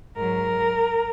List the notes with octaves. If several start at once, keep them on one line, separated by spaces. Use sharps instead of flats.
G#2 F#3 A#4